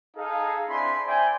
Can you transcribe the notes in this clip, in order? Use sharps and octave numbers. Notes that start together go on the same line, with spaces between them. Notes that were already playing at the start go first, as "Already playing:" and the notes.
D#4 G#4 A4 F5
C4 D4 E4 G#5 B5 C6
C5 D5 E5 G5 G#5